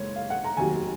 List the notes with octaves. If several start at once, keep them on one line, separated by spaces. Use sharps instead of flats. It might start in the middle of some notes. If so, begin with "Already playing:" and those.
Already playing: F#1 G#3 C#5
F5
F#5
A#5
F1 D#2 D#3 F#3 G#5